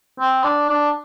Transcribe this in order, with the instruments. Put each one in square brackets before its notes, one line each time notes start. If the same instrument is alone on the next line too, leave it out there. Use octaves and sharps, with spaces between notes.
[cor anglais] C4
D4
D4